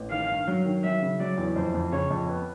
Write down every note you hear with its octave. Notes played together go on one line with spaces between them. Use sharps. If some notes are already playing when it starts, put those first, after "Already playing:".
Already playing: A1
D#3 F5
G2
F#3
D#3
F#3 E5
C#3
F#3 D5
E2
F2 C5
F2
C#3 C#5
F2
B3